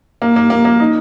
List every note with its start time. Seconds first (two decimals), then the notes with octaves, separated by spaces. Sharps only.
0.22 A#3
0.36 A#3
0.50 A#3
0.65 A#3
0.80 D#4